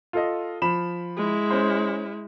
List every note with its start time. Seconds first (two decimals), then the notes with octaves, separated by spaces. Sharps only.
0.13 F4 A4 D#5
0.62 F3 B5 E7
1.17 G#3 E4
1.50 C#4 C5